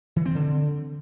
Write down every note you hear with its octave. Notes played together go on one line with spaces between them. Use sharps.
E3
C4
D3